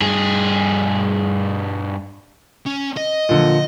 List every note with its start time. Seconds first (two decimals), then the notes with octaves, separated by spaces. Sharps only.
0.01 G2 G#4
2.66 C#4
2.97 D#5
3.29 A#2 D3 F3